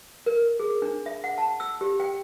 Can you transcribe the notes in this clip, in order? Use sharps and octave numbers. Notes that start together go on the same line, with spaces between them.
A#4
G#4
D4
E5
F#5
A5
E6
G4
G5